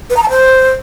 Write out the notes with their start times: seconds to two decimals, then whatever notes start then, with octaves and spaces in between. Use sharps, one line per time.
0.10 B4
0.16 A#5
0.23 A5
0.29 C5